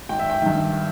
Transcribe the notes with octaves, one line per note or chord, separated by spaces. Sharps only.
G#1 G5
E5
G5
G2 D#3